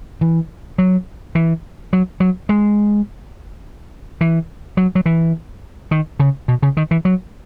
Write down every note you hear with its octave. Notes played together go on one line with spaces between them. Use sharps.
E3
F#3
E3
F#3
F#3
G#3
E3
F#3
F#3
E3
D#3
C#3
B2
C#3
D#3
E3
F#3